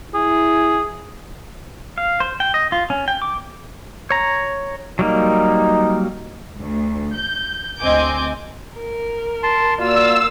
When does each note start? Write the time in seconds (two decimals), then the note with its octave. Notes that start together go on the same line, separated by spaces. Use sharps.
0.14 E4 G#4
1.98 F5
2.20 C5
2.40 G5
2.54 D#5
2.72 F4
2.90 C#4
3.08 G5
3.22 D6
4.10 C#5 A#5
4.99 F#3 G3 A#3 D#4
6.58 D2
7.14 G6
7.80 D2 C4 D#5 G#5 D6 G6
8.76 A#4
9.43 A5 C6
9.79 A#3 F4 F#4 D5 F5 E6